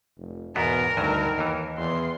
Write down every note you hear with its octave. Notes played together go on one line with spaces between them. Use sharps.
F1
E2 G#2 B2 B3 A#4
D2 G2 D#3 F#3
D#2 E3
E2 C6